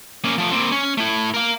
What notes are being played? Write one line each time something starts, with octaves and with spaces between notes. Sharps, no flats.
A#3 C#4
F3 A3
A#3 C4
C#4
A3 E4
A#4 F5